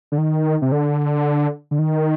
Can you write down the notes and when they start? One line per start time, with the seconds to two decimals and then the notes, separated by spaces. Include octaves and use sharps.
0.12 D3
0.18 D#3
0.62 C3
0.72 D3
1.71 D3
1.79 D#3